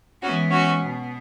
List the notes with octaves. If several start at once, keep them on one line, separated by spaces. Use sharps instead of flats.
E3 G#3 B3 C#4 F#4
C#4 F#4
B2 B3